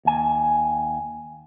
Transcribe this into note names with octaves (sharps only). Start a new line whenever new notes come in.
D#2 G#5